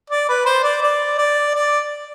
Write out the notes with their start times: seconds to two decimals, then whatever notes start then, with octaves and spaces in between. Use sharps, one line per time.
0.10 D5
0.29 B4
0.46 C5
0.64 D5
0.83 D5
1.18 D5
1.54 D5